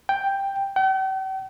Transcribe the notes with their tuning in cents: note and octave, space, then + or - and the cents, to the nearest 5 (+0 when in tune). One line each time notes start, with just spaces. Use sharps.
G5 +5
G5 -45